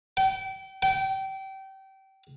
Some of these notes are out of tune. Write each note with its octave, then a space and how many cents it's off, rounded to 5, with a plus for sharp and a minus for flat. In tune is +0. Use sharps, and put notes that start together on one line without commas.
G5 -30
G5 -25